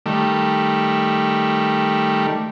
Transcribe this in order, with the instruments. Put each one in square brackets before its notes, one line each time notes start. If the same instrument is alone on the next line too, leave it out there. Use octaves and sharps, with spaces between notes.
[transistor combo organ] D#3 G3 A3